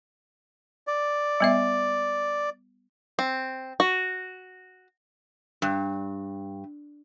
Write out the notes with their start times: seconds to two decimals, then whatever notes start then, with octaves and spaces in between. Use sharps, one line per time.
0.87 D5
1.40 G3 B3 E5
3.19 C4
3.80 F#4
5.62 G2